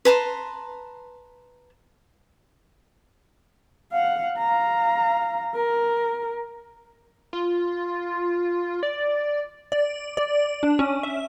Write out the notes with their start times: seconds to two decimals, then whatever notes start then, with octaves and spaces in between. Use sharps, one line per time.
0.05 B4 A5 A#5 C6
3.92 F5 F#5
4.38 F5 A#5
5.55 A#4
7.33 F4
8.83 D5
9.72 D5
10.17 D5
10.63 D4
10.79 C#4
11.03 E5